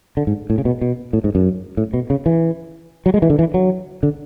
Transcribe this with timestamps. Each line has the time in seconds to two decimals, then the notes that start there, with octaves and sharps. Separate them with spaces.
0.17 D3
0.27 G#2
0.50 A2
0.58 C#3
0.65 B2
0.81 B2
1.13 A2
1.24 G#2
1.35 F#2
1.77 A2
1.94 B2
2.10 C#3
2.26 E3
3.06 F#3
3.14 G#3
3.22 E3
3.30 D3
3.39 E3
3.54 F#3
4.03 D3